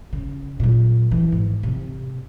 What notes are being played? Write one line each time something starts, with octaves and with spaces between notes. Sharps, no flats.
C#3
A#2 F#3
E3
G#2
C3